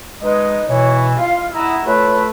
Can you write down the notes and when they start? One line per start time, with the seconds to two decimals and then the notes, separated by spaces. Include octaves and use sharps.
0.22 G#3 D#4 B4
0.68 B2 E3 C#5
1.20 F4 F5 C6
1.54 E4 F#5 A#5 D#6 E6
1.86 A3 F4 B4 C#5